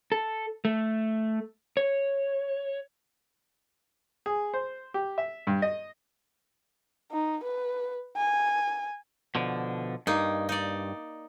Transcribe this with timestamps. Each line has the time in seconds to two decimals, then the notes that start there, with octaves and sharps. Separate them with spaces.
0.12 A4
0.65 A3
1.77 C#5
4.26 G#4
4.54 C5
4.94 G4
5.18 E5
5.47 G2
5.62 D#5
7.12 D#4
7.44 B4
8.17 G#5
9.35 B2 D3 F3
10.07 G2 A#3 D#4
10.49 D#4 D5